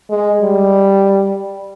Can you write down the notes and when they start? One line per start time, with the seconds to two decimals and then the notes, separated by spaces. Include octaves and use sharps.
0.10 G#3
0.42 G3